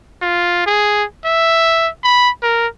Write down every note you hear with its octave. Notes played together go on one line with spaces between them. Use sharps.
F4
G#4
E5
B5
A#4